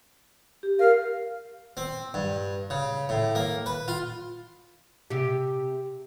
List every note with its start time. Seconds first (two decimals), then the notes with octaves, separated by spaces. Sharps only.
0.63 G4
0.79 A#4 F5
1.77 C4
2.14 G2
2.70 C#3
3.09 A2
3.35 A#3
3.66 B4
3.88 F4
5.10 C3 G4